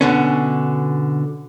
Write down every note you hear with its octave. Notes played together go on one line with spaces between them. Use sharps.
B2 D3 C#4